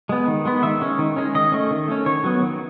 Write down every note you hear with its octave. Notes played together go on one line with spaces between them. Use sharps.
G#3 B3
D#3
G#3 B3
D#3 E5
G#3 C#4
D#3
G#3 C#4
D#3 D#5
A3 C#4
D#3
A3 C#4
D#3 C#5
F#3 B3
D#3